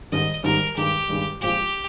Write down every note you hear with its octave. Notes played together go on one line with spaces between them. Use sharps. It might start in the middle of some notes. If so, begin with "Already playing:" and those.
G#2 D#3 G3 D#5
G#2 D#3 G3 A#4
G2 D#3 G#3 G4
G2 D#3 G#3
A#2 F3 G#3 C4 F4 G4